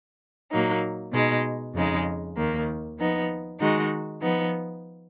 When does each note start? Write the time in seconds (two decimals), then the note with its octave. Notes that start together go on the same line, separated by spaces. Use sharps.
0.51 A#2 F#3 A#3 D#4
1.12 B2 G#3 D#4
1.74 F2 C#3 G#3 D#4
2.35 D#2 D#3 A#3
2.98 F3 B3 D#4
3.59 D#3 G#3 D#4 F#4
4.21 F3 B3 D#4